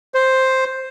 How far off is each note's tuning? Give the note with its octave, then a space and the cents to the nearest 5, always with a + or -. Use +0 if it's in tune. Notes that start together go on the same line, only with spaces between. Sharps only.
C5 +5